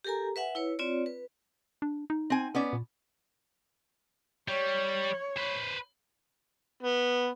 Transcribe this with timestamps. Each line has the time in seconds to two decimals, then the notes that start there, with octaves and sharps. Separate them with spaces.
0.04 G4 A4 A#4 G#5 A#5
0.36 B4 E5 F#5 G#5
0.55 E4 B4 C#5
0.79 C4 F4 C#5 D5
1.06 B4
1.82 D4
2.10 D#4
2.30 C4 G#5
2.55 B3 C#4 D5
2.73 A#2
4.48 G3 C#5
5.38 B4 C5
6.83 B3